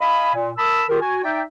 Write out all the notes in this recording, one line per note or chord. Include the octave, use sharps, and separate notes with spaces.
D#5 F5 G#5 B5
A#2
A#4 A5 B5 D#6 E6
D#3 F4 G4 G#4 A#4
F#4 G#5
D#4 D5 E5 G5